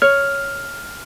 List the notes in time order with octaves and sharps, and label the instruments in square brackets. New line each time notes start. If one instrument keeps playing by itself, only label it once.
[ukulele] C#5 [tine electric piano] F6